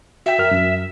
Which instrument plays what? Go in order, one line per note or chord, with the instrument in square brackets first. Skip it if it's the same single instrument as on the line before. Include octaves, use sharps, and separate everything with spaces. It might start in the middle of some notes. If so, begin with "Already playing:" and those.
[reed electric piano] F#4 G5 [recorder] E5
[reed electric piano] F#2 A#4 F6
F#2